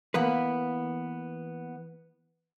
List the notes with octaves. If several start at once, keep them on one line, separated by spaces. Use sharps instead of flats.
E3 A#3 B3 B4